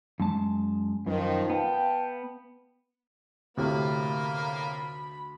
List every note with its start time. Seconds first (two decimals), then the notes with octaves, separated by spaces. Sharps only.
0.20 F#2 G#3 A5
1.06 F#2 D#3 F3
1.50 B3 F5 G5 A5
3.57 D2 A2 C3 A#3 F4 B5